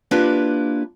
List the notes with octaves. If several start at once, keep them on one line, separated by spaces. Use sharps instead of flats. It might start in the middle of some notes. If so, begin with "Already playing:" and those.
A#3 D4 E4 F4 G4 B4